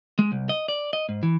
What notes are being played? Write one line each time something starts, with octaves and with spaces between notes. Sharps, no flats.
G#3
C2
D#5
D5
D#5
G#2
E3